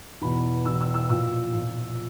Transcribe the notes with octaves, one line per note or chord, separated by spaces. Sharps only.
E2 B2 B5
E2 B2 E6
E6
E6
A#2 F3 E6
A#2 F3